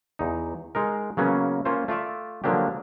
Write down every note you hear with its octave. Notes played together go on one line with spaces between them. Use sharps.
E2 D#4
G#3 D#4 A#4
C#3 F#3 A#3 B3 C#4
A#3 C#4 F4 C5
A3 F4 D5 E5
D3 F3 F#3 A#3 D4 G4